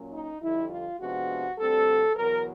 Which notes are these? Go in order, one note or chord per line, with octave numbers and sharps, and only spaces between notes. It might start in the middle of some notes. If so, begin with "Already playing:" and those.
Already playing: A#2 F#3 A#3 C#4
D#4
F2 D3 G3 E4
F4
C3 F3 G#3 B3 D4 F#4
D2 D3 G3 C4 A4
E2 B2 F#3 A#4